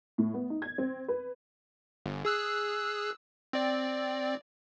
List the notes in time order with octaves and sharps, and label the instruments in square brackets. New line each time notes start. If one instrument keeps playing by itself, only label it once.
[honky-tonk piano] A2
B3
D#4
G#6
C4
B4
[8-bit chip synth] G1
G#4 E6 F#6
C4 D5